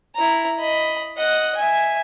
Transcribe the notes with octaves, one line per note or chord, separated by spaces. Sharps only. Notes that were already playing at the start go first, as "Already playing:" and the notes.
E4 A#5
D#5 B5
D#5 F#5
E5 G#5